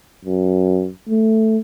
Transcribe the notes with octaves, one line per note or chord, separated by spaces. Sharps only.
F#2
A3